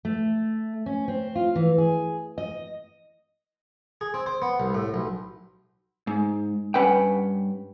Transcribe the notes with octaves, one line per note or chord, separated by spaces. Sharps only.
A3
C#4
C4
F4
E3
G#4
D#5
G#4
C4
C5
B3
C2
A2
B1
G#2
G2 C#4 B4 F#5 G5